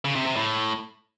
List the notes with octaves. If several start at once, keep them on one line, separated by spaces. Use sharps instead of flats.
C#3
C3
C3
A2